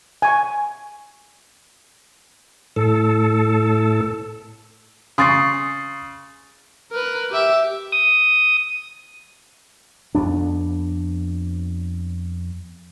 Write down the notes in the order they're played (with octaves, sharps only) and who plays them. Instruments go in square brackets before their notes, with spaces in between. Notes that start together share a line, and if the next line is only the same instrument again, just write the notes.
[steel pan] G#5 C#6
[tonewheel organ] A2 A4
[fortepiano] C#3 [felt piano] C6 C#6 [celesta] D#6 A6 C7
[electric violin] A#4 B4
G4 E5
[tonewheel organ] D#6
[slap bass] F2 B3 D4